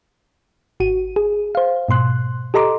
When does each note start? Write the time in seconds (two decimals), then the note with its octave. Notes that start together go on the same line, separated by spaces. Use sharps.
0.80 G#1 F#4 D#7
1.16 G#4
1.55 C5 F5
1.89 G#2 B2 C6 F#6
2.54 G4 A4 D#5 A#5 C6 D6